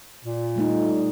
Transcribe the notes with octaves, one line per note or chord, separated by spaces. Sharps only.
A#2
G3 A3 D#4